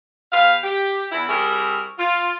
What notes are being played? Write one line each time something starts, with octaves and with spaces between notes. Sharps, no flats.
E2 G4 B4 F5
G4
E2 E4
G3 C4 E4 F#4 G#4 A#4
F4